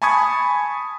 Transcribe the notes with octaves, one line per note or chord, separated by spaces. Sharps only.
G#5 A5 B5 C#6 D#6 G#6